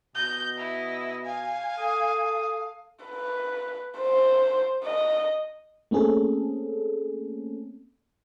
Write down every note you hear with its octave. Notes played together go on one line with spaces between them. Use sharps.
B2 D#5 G6
E4
F5 G#5
A4 D#6
B4
C5
D#5
A3 A#3 C4 C#4 G#4 A4